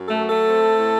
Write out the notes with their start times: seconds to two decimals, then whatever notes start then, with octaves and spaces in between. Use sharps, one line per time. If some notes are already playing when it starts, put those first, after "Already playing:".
Already playing: F#2
0.08 A3 A4
0.19 F#3
0.28 A3 A4
0.49 C4
0.78 A2